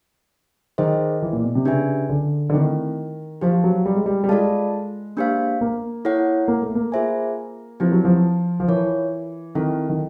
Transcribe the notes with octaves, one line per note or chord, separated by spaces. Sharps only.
D#3 D#4 G#4 C5 D#5
E3
A#2
B2
C3
C#3 D4 G4 B4 E5 G#5
D3
D3
D#3 A3 C4 E4
F3 G4 C5 F5
F#3
G3
G#3
G3
G3
G#3 F4 A4 D5 F5 A5
A#3 D4 G4 C5 F5
A#3
E4 A4 C#5 F#5
A#3
A3
A#3
F4 G#4 C5 E5 G#5
F3 C4 E4 G4 B4
F#3
F3
F3
E3 F4 A#4 C#5
D#3 C4 E4 A4
D#3